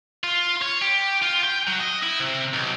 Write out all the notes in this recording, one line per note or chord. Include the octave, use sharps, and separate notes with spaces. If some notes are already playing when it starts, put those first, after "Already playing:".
F4
C#5
G4
F4
G5
F#3
D#5
E4
C3
B1